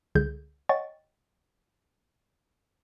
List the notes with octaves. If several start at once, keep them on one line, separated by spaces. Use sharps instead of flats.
C#2 D3 G#4 G6
C#5 D#5 F#5 G5 C#6 A6